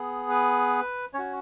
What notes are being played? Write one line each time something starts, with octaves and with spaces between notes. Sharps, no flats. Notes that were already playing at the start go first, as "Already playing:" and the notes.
Already playing: B3 G#4
B4
C#4 F#4 C#5